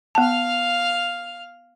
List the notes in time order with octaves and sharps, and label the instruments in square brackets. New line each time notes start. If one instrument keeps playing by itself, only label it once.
[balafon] B3 A5 [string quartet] F5 F6